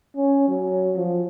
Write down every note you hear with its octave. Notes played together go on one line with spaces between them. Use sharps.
C#4
F#3
F3